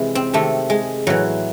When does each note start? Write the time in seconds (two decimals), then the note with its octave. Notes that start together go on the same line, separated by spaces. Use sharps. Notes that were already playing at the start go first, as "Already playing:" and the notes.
Already playing: C3 E3 G#3
0.15 C4
0.34 C3 D#3 A3
0.70 G#3
1.07 A2 E3 F#3